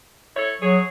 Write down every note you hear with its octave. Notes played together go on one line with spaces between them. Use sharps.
E4 A4 C#5
F#3 G#4 C#5